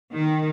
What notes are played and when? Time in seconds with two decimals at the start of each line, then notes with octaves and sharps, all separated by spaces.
0.14 D#3